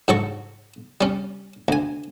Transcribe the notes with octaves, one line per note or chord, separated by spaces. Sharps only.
G#2 F#3 A4 C#6
G3 C#4
D2 G#5